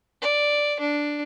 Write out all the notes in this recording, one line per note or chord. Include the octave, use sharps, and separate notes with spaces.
D5
D4